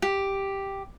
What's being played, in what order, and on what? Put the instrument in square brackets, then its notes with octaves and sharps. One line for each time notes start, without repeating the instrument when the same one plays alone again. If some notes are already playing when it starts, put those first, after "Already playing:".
[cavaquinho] G4